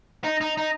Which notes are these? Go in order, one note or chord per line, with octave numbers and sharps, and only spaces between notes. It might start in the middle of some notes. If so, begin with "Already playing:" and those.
D#4
D#4
D#4